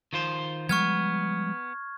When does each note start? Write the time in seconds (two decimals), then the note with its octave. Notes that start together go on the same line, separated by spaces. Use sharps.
0.13 D#3 F4 C5
0.69 F3 G3 G#3 B3 C#6 F6 G#6